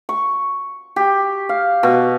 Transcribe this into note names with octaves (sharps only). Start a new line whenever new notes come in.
C#6
G4
F5
B2